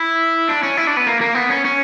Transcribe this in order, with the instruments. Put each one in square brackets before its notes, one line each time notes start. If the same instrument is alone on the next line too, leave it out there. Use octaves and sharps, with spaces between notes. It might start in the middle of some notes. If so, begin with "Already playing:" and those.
Already playing: [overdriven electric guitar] E4
D4
C#4
E4
D4
B3
A#3
A#3
B3
C#4
C#4